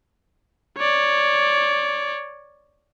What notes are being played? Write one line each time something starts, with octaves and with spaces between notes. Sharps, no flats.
C#5 D5